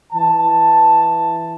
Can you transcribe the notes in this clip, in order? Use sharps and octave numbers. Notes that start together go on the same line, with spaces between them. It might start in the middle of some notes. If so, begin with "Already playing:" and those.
E3 A5